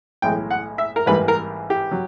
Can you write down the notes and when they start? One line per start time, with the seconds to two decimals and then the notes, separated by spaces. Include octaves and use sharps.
0.22 B1 A2 E3 G#3 G5
0.51 F#5
0.78 E5
0.96 A#4
1.06 A1 G#2 E3 G3 A#3 B4
1.28 A#4
1.70 G4
1.91 F#3